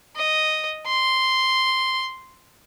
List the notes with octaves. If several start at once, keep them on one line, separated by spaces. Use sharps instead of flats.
D#5
C6